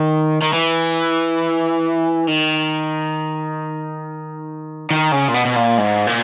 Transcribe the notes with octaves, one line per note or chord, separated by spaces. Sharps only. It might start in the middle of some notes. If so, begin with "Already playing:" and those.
Already playing: D#3
D#3
E3
D#3
D#3
C#3
A#2
B2
B2
A#2
G#2
A#2